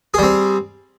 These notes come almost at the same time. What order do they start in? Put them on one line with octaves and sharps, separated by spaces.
G#4 G3 C4